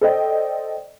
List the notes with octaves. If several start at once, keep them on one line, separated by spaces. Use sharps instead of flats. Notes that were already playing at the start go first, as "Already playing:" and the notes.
A4 C5 D5 D#5 G5